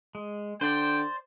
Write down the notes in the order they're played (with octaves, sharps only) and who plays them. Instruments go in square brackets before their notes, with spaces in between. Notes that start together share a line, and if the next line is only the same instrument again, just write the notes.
[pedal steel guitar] G#3
[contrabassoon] D3 [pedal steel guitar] C5 D5 [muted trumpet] G5